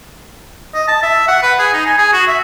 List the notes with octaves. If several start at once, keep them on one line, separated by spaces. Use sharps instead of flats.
D#5
A5
E5
F#5
B4
G#4
D#4
G#5
G#4
F#4
E5